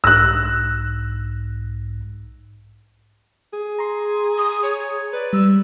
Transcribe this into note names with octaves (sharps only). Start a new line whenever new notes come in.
B1 G#2 E6 F#6 A#6
G#4
A#5 C6
D#6
C#5
B4 D5
G3 E6